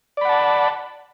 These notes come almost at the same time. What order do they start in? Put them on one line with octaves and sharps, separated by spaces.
D5 B5 F#5 A5